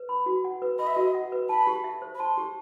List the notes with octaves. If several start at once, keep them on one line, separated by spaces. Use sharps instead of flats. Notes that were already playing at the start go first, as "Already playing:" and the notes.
Already playing: B4
B5
F#4
F#5
B4
D#5 B5
E5
F#4 D#5
F#5
B4
A5 B5
G4
E5
C5
B5
A5 C6
G4